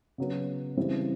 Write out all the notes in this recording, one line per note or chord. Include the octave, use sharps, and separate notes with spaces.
C#3 F#3 B3
C#3 E3 G3 C4